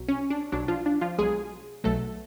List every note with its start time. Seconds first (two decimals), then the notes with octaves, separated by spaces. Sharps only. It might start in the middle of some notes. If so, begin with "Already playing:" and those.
Already playing: B1 B2 F#3
0.08 C#4
0.30 D4
0.52 B1 B2 F#3 D4
0.68 F3 F4
0.86 D4
1.01 F3 F4
1.18 B1 B2 F#3 G#3 G#4
1.84 B1 B2 F#3 A3 A4